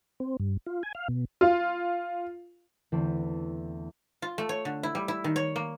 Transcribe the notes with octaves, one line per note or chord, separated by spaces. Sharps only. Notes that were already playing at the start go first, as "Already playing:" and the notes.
C4
G2
F4
G#5
F5
B2
F4
E2 D3 E3 A3 C4 E4
F4
A3
C#5
D3
E4
G3
E4
D#3
C#5
A#3